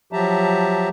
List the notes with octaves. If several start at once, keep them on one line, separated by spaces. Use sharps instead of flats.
F3 F#3 G4 E5 A5 A#5